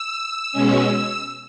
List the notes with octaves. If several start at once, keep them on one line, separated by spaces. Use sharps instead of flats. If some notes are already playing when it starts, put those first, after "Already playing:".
Already playing: E6
B2 G#3 C#4